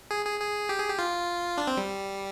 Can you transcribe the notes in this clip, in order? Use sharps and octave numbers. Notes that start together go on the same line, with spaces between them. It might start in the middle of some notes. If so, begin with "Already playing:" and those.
G#4
G#4
G#4
G4
G#4
G4
F4
D4
C4
G3